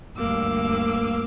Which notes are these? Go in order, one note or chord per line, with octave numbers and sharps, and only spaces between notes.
D2 G2 A#3 D6 E6